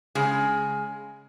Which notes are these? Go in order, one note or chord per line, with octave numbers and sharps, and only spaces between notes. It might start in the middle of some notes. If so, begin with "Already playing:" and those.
C#3 G#3 G#4